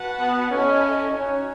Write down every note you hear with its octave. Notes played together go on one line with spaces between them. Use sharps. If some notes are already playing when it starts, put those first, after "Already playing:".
Already playing: F#4 B4 F#5 A5
B3
C#4 E4 A4 D#5 G#5
C#4 D#4 F#4 C#5